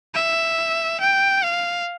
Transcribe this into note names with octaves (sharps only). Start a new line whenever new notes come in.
E5
G5
F5